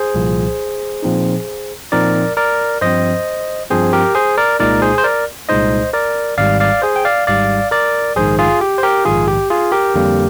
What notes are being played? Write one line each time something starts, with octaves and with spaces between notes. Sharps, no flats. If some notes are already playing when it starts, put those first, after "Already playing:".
Already playing: G#4 C5
C2 A#2 F3
A#2 F3 C4 D#4
A#2 F3 C4 D#4 A#4 D5
A#4 D5
G2 F3 C4 C5 D#5
G2 F3 C4 G#4 C5
G4 A#4
G#4 C5
A#4 D5
C2 A#2 G#3 D#4 A#4 D5
G#4 C5
C5
A#4 D5
C2 A#2 G#3 D#4 C5 D#5
A#4 D5
G#1 G#2 G3 D5 F5
D5 F5
G#4 C5
G5
D5 F5
G#1 G#2 G3 D5 F5
A#4 D5
A#1 G#2 D#3 G#4 C5
F4 G#4
G4
C5
G4 A#4
A#1 G#2 D#3 F4 G#4
G4
F4 G#4
G4 A#4
F2 D3 G3 A#3